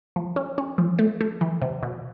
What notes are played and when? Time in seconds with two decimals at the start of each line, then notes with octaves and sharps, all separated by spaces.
0.16 F3
0.36 C#4
0.58 C#4
0.78 F3
0.99 A3
1.21 A3
1.41 E3
1.62 C3
1.83 B2